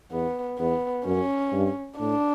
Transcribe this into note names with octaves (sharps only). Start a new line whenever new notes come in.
E2 B3
E2 B3
F#2 C#4
G2
A2 D4